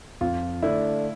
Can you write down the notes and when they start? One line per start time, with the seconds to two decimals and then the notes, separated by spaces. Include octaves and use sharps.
0.21 F2 F4
0.62 D3 A3 D4 E4